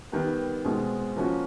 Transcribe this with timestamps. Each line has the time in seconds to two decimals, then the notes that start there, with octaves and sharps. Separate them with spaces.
0.12 D#3 G3 B3
0.65 B2 G#3 C4
1.16 F3 A#3 C#4 F#4